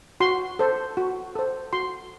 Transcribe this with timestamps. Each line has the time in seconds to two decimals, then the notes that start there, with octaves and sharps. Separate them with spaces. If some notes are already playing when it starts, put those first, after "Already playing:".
0.20 F#4 C6
0.59 A4 C5
0.97 F#4
1.35 A4 C5
1.73 F#4 C6